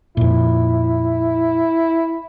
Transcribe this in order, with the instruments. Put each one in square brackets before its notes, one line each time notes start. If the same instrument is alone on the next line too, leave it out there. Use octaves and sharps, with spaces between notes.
[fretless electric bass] F2 A#2 [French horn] E4